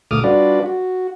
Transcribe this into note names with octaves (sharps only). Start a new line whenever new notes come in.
D2 A#2 A3 D6 D#6 F6
G3 D4 F4 F#4 B4 D5
F#4